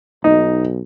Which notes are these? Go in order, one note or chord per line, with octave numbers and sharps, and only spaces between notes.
B1 D#4